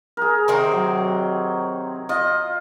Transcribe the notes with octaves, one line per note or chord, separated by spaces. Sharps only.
G#4 A#4
C3 D#3 C4
F#3
F4 D#5